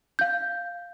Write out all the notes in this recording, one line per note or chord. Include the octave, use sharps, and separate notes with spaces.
F5 G6